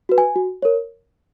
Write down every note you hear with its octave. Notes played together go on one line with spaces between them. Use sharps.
F#4 B4
G#5
F#4
A#4 C#5